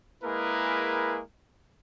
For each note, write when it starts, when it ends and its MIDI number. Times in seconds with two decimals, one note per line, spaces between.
0.24 1.21 56
0.24 1.21 58
0.24 1.21 64
0.24 1.21 68
0.24 1.21 70
0.24 1.21 71